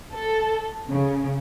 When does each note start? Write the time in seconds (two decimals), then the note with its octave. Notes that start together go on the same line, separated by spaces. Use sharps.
0.13 A4
0.89 C#3